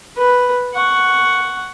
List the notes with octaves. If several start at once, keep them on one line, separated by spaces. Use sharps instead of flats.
B4
F#5 C#6